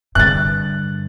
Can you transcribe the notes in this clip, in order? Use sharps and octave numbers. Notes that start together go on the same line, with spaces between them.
G2 D3 F#6 A6